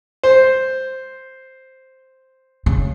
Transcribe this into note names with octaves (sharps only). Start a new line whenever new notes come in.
C5
C#3